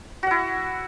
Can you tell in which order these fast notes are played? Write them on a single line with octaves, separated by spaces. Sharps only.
F#4 F#5 E4